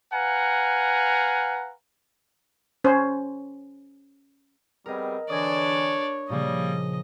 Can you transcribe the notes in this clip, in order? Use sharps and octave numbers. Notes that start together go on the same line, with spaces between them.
B4 F5 F#5 G#5 A#5
C#4 C5
G3 B3 C4 G#4 A#4 D#5
D3 E3 D4 C#5 D5 D#6 G#6 A#6
A#2 C#3 F3 G3 A#3 D#5